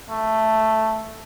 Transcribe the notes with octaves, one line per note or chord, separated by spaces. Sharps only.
A3